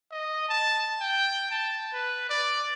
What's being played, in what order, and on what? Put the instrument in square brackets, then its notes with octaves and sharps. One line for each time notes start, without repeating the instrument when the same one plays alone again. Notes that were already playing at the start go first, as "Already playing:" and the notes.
[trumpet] D#5
A5
G5
A5
B4
D5